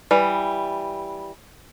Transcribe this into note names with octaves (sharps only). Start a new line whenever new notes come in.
E3 G3